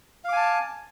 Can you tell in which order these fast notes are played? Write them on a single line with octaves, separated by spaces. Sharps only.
F5 D6 G#5 A5